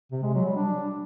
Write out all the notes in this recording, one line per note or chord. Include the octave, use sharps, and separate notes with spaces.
C3
G#3
F#3
G3
D4